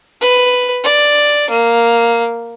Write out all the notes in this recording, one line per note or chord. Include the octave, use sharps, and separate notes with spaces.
B4
D5
A#3